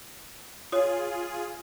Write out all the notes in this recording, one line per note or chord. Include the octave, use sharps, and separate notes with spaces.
F4 G#4 C#5 D#6